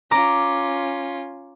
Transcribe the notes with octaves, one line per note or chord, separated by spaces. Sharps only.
C#4 F4 A#5 D6